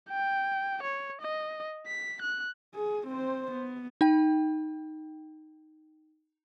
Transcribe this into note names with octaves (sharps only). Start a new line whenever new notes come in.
G5
C#5
D#5
B6
F#6
G#4
C4 C5
B3
D#4 G5